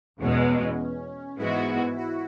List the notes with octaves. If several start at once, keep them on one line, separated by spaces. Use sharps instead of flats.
E2 B2 G#3 C#4
G#2 E3 G#3 B3 E4 F#4
F#4